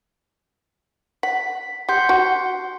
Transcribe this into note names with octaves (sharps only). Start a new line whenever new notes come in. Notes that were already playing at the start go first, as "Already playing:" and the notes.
F#5 B6
G4 F#5 C6 G6
F#4